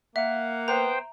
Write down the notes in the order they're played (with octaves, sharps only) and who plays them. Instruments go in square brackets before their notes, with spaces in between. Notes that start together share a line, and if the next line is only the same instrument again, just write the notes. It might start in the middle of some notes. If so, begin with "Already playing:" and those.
[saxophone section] A#3 F#5 [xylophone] E5
[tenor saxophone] B3 [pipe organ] C5 G5 [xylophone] A#5